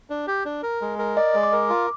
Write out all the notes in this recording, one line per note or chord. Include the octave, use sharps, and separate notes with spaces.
D4
G4
D4
A#4
G#3
A#4
D5 D#5
G#3
D6
A#4
F4